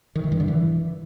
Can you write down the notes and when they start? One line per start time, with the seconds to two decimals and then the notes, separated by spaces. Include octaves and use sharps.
0.15 D#3
0.24 E3
0.32 G2
0.40 D3
0.48 E3